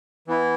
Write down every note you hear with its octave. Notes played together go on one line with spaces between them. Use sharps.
E3 B3 E4